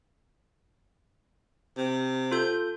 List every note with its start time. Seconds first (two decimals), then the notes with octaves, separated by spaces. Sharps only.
1.77 C3
2.31 F4 A4 G6